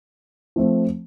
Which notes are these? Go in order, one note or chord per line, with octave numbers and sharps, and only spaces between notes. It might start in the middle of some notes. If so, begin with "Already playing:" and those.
F3 A3 C4